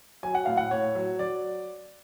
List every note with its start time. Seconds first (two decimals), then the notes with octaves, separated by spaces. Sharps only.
0.23 F#3 G#5
0.35 F#5
0.46 A2 F5
0.57 F#5
0.71 A2 C#5
0.95 F#3
1.19 F#3 D5